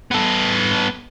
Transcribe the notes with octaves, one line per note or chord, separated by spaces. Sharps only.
B3 A4